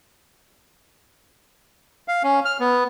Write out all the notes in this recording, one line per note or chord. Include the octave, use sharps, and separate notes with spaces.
F5
C#4
F6
B3